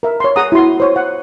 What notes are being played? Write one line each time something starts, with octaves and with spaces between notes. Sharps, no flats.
A#4 E5
C#5 C6
G#4 F#5 A#5 D#6
E4 F#4 C6
C5 C#5
F#5